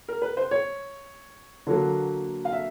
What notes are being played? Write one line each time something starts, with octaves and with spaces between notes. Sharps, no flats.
A#4
B4
C5
C#5
D3 F#3 A#3
F5
E5